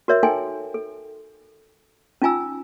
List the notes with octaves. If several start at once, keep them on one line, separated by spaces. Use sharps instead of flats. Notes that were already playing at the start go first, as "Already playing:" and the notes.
F#4 A#4 C#5 E5
D#4 A4 G5 G#5 C6
A4
C#4 D#4 F4 G#5 A#5 E6